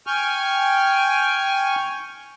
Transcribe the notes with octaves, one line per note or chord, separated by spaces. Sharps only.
G5 G#5 C#6 F6